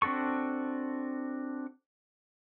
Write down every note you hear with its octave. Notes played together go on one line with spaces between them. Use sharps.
C4 D4 F#4 A4 C#6